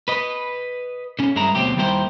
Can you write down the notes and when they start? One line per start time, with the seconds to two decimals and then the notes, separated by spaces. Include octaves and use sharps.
0.08 B4 D#5
1.19 D3 C#4
1.36 G2 G#3 E4 A#4 A#5
1.55 D2 B2 F#3 C4 G4
1.77 D#2 G3 E4 A#4 C5 G5